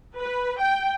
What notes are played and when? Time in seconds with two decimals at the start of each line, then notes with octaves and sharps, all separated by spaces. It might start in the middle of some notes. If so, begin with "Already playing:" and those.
0.17 B4
0.58 G5